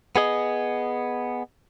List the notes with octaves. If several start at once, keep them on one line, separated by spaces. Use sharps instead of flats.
B3 G#4 D#5